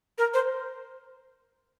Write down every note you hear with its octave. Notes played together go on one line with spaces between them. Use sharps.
A#4
C5